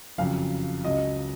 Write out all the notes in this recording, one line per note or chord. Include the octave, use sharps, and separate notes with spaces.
F#1 F2 C#3 F#3 F5
C#2 C#3 F#3 D#5